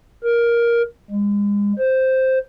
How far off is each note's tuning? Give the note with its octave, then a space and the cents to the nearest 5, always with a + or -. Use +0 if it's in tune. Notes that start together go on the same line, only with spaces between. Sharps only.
A#4 +10
G#3 -35
C5 +0